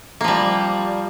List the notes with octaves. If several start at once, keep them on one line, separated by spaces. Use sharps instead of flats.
F3 G3 A#3